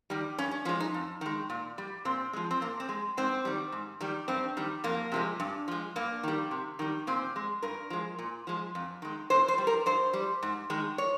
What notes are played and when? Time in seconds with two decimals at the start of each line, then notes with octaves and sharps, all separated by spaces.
0.10 D#3 G3
0.39 G2 C#4
0.51 C#4
0.65 F3 G#3 C#4
0.80 D#4
0.94 F2
1.21 D#3 G#3
1.50 A#2
1.78 G3
2.05 A#2 C4
2.33 F3 G#3
2.51 C4
2.61 A#2 A#3
2.80 C4
2.89 G#3
3.17 G#2 C4
3.45 D#3 G3
3.72 G#2
4.01 D#3 G3
4.28 G2 C4
4.57 D#3 G3
4.84 F2 A#3
5.12 C3 F3 G#3
5.40 G2
5.68 F3 G#3
5.96 G2 A#3
6.24 D#3 G3
6.51 C3
6.79 D#3 G3
7.07 A#2 C4
7.36 G#3
7.62 G2 A#4
7.90 F3 G#3
8.19 A#2
8.47 F3 G#3
8.75 F2
9.02 D#3 G#3
9.30 C3 C5
9.48 C5
9.58 G3
9.67 A#4
9.86 G2 C5
10.13 G3
10.43 G#2
10.70 D#3 G#3
10.98 C#5